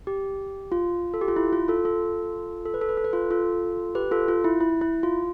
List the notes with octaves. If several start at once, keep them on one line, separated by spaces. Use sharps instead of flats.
G4
F4
A4
G4
F4
E4
F4
F4 A4
F4 A4
A4
B4
A4
B4
A4
B4
F4 A4
F4 A4
G4 B4
F4 A4
F4
E4
E4
E4
F4